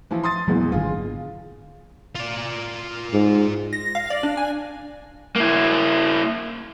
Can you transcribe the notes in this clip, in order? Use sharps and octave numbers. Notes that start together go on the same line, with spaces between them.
E3 F3 E4
C6 D#6 A6
E2 A#2 F#3 G#3 A3 B3
G#1 D3 F4 G#4
F4 D5
G#2
A#6
F5
D5
D4
G#5
A#3 E4